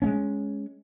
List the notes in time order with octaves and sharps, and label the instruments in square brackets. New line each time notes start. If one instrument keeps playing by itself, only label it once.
[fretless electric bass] G#3 B3 C#4